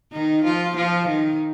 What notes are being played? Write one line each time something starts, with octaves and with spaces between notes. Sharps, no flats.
D#3 D#4
F3 F4
F3 F4
D#3 D#4